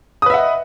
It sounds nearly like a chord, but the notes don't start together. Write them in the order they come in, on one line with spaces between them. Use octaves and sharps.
D#6 B4 E5 F#5 D#5